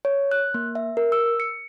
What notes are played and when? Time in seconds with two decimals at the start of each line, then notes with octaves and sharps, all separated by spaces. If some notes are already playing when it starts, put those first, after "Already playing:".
0.05 C#5
0.32 F#6
0.54 A#3
0.75 E5
0.97 A#4
1.12 E6
1.40 C#7